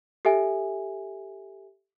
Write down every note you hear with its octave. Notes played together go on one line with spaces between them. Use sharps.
G4 A4 E5 G#5